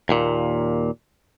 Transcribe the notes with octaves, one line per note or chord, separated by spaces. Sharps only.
D#2 A#2